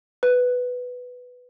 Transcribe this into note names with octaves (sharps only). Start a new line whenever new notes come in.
B4